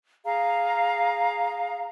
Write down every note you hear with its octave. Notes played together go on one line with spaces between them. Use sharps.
G#4 F5 A#5